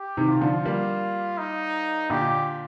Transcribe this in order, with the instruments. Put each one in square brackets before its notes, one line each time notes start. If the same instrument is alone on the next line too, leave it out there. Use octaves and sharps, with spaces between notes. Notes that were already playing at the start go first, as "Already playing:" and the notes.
Already playing: [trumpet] G4
[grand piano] C3 D#3
[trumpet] F4
[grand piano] D3 F3
G3 A#3
[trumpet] D#4
[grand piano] A#2 D3 [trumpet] G4